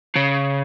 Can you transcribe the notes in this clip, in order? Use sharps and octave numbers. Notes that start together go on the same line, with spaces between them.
C#3